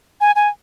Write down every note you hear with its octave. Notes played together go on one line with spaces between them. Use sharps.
G#5
G#5